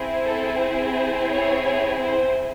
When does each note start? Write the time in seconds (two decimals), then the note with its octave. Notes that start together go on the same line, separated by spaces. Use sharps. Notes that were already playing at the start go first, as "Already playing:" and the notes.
Already playing: C4 E4 G#4
0.25 A4
0.60 C5
1.30 C#5
1.65 C#5
2.00 C5